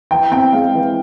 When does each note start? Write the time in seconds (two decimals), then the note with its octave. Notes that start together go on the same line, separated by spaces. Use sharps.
0.11 E3 G5
0.32 C4 G5
0.52 G#3 F5
0.74 E3